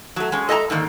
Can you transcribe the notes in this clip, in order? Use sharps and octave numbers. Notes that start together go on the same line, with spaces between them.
F#3 A3
G#3 C#4
A4 D#5 E5 G#5 A#5
G#2 D3 D#3 A#3